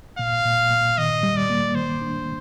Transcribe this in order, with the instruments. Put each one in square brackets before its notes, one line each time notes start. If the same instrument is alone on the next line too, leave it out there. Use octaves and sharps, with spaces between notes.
[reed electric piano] A#2 [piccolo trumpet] F5
[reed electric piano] A#2
A#2
[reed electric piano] D#3 [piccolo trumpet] D#5
[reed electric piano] G3
[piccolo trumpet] D5
[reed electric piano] A#3
[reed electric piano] D#3 [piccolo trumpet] C5
[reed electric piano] D4